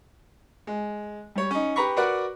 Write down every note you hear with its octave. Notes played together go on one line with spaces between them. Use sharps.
G#3
G3 C#5
C#4 D#4
G4 B4 A#5 B5 C#6
F#4 A#4 B4 D5 F#5